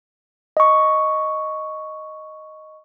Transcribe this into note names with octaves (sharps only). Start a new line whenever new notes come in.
D#5 C#6